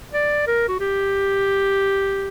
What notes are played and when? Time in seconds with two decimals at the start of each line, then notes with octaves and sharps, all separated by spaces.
0.14 D5
0.47 A#4
0.68 F#4
0.80 G4